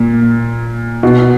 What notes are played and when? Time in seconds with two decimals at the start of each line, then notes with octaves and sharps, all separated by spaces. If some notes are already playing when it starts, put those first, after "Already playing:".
Already playing: A#2
1.03 B2